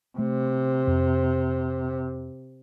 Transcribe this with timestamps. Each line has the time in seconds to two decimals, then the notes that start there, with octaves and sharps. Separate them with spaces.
0.18 C3 A3
0.87 F2